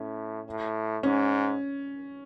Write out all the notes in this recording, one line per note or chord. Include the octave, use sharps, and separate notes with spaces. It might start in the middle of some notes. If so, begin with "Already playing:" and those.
Already playing: A2 C#4
A2
G#2 C#4